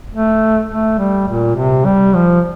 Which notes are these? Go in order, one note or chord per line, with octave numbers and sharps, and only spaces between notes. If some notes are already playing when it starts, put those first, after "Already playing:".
A3
A3
G3
A#2
C3
G3
F3